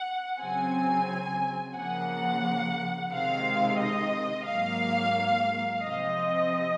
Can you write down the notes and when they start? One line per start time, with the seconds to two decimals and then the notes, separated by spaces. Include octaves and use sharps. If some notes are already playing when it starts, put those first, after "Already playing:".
Already playing: F#5
0.40 C#3 F#3 C4 G#5
1.76 C#3 F3 A#3 F#5
3.12 C3 D#3 G#3 C4 F5
3.80 D#5
4.47 G#2 F#3 A#3 F5
5.84 C3 F3 C4 D#5